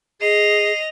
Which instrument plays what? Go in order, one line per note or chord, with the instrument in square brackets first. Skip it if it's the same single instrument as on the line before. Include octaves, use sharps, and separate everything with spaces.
[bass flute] G#4 [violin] D#5 F7 [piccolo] C7